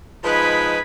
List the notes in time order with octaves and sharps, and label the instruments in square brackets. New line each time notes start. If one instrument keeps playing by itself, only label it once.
[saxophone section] F3 G#3 D#4 [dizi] B4 [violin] B5 G#6